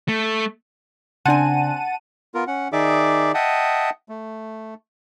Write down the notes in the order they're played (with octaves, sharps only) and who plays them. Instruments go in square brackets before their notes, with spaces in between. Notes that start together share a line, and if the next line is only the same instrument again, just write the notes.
[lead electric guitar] A3
[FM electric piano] C#3 D4 [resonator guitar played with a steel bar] C4 G#5 [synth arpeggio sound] F#5 A5 D#7
[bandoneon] B3 F4 A#4
C#4 F#5
D#3 D#4 G#4 D5 E5 D6
D#5 E5 F#5 G5 A5 D#6
A3